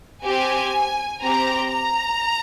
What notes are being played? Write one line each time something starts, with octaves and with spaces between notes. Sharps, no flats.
C4 G4 G#5
C4 G4 A#5
A#5